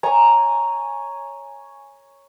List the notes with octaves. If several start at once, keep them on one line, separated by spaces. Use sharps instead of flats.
C#5 G#5 A#5